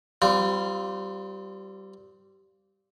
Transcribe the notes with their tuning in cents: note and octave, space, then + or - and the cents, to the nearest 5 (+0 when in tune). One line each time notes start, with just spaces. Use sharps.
G3 -20 C4 -35 F4 +0